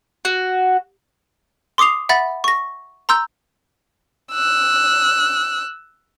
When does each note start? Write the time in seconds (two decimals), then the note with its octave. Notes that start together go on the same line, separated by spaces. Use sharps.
0.25 F#4
1.78 C6 D6 D#6 C7 F7
2.09 E5 F#5 B5 A6
2.44 C#6 A#6
3.09 A#5 C6 E6 G6
4.32 E6 F#6